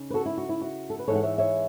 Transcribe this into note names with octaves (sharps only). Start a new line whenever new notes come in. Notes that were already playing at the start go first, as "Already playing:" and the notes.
Already playing: C#3 D#4
B4
F#4 A4
E4
F#4
E4
F#4
A4
B4
G#2 E3 G#3 B3 D#4 A4 C#5
F#5
C#5 E5
C#5 E5